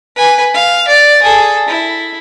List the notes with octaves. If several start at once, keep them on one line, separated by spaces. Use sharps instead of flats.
B4 G#5
F5
D5
G#4 A4
E4